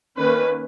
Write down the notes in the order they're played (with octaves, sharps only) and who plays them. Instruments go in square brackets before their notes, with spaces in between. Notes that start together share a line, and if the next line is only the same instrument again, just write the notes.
[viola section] D#3 A#3 C#4 B4